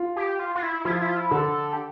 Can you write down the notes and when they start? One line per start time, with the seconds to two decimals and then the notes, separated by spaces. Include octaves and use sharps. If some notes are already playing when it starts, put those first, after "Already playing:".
Already playing: F4
0.16 G4
0.39 F4
0.55 F4
0.63 E4
0.85 F3 E4
0.93 F4
1.01 E4
1.09 F4
1.17 E4
1.31 D3 A4
1.73 G4